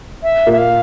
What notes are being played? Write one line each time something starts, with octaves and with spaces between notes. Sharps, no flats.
E5
A#2 A#3
E5
F5